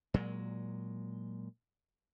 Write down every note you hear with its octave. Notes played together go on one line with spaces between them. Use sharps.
A#2 F#3 G#3